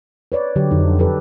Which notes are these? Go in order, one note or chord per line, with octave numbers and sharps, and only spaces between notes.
B4 C#5 D5
D3 F#3 G4
F2 D3 D#4
G4 A4 B4